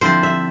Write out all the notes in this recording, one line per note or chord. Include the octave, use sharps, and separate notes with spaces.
D3 F3 C4 E4 C5
E5